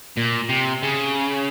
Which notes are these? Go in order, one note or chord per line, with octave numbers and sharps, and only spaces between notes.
A#2
C3
C#3